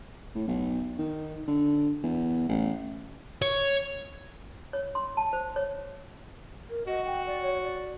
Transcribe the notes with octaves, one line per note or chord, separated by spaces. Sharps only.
A2
B1
D#3
D3
E2
A1
C#5
C#5
C6
A5
C5
C#5
A#4
F#4 D#5
G5
D5
C#5
D5